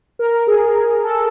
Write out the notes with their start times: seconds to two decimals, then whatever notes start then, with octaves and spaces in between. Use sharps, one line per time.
0.19 A#4
0.47 G#4
0.75 G#4
1.04 A4